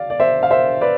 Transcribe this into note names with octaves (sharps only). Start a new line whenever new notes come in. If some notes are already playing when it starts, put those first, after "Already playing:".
Already playing: D5 F5
D5
C5 E5
F5
C5 E5
B4 D5